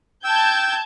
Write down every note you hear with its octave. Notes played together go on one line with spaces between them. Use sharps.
G5 A5 E6 G6 G#6